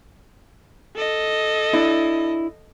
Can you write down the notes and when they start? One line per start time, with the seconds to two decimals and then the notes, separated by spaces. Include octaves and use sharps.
0.96 A4 D#5
1.73 D4 E4